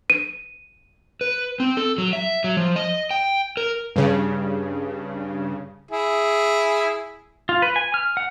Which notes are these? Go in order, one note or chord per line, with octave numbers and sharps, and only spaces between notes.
D#7
B4
C4
A4
F#3
E5
F#3
F3
D#5
G5
A#4
G2 C#3
E4 G#4
F4
B4
G#5
F6
F#5